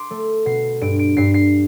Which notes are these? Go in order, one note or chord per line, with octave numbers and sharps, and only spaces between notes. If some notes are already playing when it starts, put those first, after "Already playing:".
Already playing: C6 D6
A3
B2 C7
G2 D7
D7
G2 C7
C7